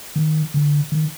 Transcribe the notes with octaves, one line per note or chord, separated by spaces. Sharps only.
D#3
D3
D#3